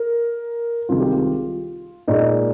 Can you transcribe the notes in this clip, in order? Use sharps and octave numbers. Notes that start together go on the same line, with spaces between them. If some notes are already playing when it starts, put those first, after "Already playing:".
Already playing: A#4
C2 C3 D#3 G#3 F4
G4
F4
A#2 G#3 D#4